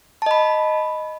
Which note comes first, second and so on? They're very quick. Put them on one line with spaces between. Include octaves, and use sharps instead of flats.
A5 D#5 B5